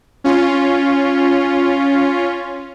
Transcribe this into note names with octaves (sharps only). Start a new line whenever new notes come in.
C#4 F4